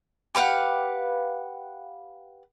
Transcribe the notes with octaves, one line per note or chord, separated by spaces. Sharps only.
G4 B4 F5 F#5